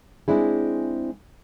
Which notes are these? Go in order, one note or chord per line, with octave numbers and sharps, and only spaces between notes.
G#3 C4 D4 E4 G#4